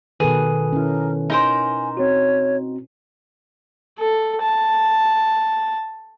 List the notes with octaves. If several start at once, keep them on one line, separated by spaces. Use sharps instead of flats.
B2 D#3 G#4 A4 B4
C#4 E4 A#4
D#4 A#4 C5 G#5
C4 F#4 C#5
A4
A5